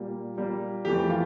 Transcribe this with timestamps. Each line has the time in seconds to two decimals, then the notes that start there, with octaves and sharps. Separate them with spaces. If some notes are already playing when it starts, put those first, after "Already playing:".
Already playing: A#2 G3 A#3
0.37 A#2 G3 A#3
0.85 F2 E3 A3 G4
1.10 F4